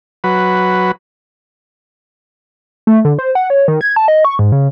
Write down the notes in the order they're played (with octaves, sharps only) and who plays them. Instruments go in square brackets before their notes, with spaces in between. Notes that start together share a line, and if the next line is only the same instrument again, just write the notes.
[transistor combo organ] F#3 B4
[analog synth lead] A3
D3
C5
F#5
C#5
D#3
G#6
A5
D#5
C#6
G#2
C#3